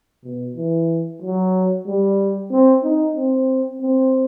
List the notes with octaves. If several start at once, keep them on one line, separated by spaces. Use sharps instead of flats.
B2
E3
F#3
G3
C4
D#4
C4
C4